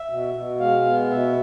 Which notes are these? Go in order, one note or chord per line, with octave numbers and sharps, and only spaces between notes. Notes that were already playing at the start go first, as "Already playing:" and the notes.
Already playing: E5
B2
B2
G#3 F5
B3
B2 E5